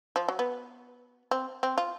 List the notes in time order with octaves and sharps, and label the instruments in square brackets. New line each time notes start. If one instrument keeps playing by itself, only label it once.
[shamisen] F3
F#3
B3
C4
C4
F4